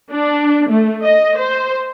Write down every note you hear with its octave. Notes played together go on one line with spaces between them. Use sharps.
D4
A3
D#5
C5